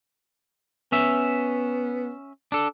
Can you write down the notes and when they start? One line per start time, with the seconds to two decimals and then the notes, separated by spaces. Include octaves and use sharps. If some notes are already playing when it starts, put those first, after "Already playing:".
0.92 B3 C#4 E5
2.52 D4 A4